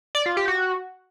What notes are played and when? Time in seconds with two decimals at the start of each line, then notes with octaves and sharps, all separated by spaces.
0.15 D5
0.26 F4
0.37 G4
0.48 F#4